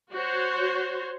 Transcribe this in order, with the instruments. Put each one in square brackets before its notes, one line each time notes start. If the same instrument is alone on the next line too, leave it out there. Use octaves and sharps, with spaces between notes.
[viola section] F#4 C5 C#5